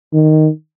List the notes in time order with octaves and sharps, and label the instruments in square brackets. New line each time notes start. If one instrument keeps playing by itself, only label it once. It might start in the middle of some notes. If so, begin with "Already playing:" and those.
[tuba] D#3